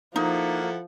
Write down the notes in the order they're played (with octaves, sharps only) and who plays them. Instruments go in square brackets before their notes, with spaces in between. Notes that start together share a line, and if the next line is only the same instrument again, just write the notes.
[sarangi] F3 [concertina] A#3 [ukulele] D#4 [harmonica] E4 A4 F#5